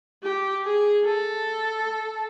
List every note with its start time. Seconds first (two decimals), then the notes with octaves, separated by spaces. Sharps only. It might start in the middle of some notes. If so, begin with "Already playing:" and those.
0.23 G4
0.64 G#4
1.05 A4